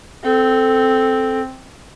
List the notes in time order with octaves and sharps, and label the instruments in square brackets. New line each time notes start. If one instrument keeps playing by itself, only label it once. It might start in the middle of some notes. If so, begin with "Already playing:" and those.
[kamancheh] C4 [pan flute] A4